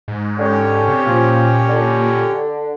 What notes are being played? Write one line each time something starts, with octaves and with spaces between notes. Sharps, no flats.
G#2
D3 C#4 G4 C#5
C3
A#2 F3
D3